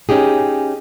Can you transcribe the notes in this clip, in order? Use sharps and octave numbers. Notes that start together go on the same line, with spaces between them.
C#4 D#4 G4 G#4